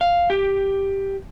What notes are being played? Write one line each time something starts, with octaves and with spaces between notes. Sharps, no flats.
F5
G4